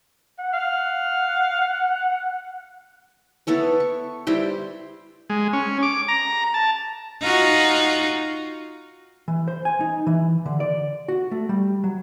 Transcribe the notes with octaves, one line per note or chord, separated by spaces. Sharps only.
F#5
F5
B3 E4 A4 C#5
C#6
G3 E4 C5 G5
G#3
C#4
D6
A#5
A5
D#4 F4 F#4
E3
C5
G#5
D#4
E3
D3
D5
F#4
A3
G3
F#3